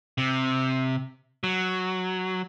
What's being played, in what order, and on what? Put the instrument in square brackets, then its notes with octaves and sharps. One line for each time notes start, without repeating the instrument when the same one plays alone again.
[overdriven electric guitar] C3
F#3